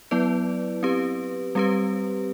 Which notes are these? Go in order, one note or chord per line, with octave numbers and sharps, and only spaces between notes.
F#3 B3 E4 B4 D5
C4 G4 B4
G3 C4 G4 B4